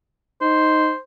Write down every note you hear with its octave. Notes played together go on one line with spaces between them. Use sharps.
D#4 C5